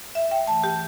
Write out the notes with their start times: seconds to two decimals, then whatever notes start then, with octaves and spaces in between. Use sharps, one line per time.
0.15 G2 E5
0.31 G5
0.47 E3 A3 A5
0.64 G4